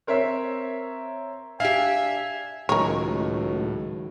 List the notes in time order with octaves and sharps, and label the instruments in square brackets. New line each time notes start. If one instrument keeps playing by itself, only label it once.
[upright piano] C4 A#4 C#5 E5
[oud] D4 G4 [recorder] E5 [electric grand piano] F5 [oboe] G#5
[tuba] C#2 [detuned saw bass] A2 [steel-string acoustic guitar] D#3 F#3 [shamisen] A#4 C#5